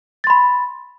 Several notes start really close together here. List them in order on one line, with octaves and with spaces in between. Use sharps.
A6 C6 B5